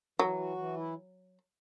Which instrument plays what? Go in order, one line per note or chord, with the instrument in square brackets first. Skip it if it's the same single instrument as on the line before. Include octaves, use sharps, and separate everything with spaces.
[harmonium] E3 [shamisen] F#3
[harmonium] F#4
E3
E4